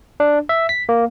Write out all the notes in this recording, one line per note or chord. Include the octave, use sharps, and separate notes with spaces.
D4
E5
B6
A#3